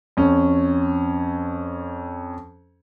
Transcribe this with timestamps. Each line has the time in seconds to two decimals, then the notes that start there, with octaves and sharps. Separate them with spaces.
0.17 F2 C#4